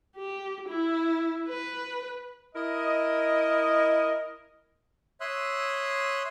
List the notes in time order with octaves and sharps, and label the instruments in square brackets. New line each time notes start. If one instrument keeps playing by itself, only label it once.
[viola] G4
E4
B4
[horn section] E4 A#4 D#5
[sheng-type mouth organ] C#5 E5 C6 D#6 E6 F#6